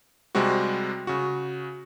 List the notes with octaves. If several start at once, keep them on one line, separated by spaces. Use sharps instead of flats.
C3 G3 G#3 C4 F#4
C#3 F#4